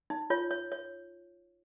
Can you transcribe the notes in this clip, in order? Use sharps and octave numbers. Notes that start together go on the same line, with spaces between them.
D#4
F4 C#5
C#5
C#5